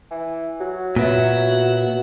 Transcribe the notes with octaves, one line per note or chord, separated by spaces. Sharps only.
E3
F#3 F#4
A#2 F#3 B3 E5 F#5